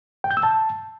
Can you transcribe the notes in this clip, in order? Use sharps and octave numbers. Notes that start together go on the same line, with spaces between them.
G5
G6
E6
A5